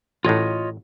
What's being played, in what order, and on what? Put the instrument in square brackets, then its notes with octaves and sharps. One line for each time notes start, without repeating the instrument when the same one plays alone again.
[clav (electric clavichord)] A1 A2 [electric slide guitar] F4 C#5 D#5